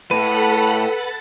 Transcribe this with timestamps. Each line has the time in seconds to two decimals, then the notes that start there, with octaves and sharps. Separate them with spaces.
0.11 A2 A4 B4 F#5 B5
0.89 A6